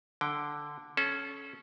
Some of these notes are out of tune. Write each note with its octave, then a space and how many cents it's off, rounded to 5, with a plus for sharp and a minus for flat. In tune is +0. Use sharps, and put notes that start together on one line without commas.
D3 +0 G5 -5
C#4 +0 A4 -30